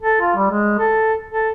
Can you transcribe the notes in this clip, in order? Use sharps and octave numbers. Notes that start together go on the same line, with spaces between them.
A4
F4
G3
G#3
A4
A4